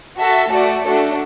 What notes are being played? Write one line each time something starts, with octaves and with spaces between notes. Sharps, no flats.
F#4 A4 E5 A5
A3 F#4 A4 D5
A3 D4 F#4 A4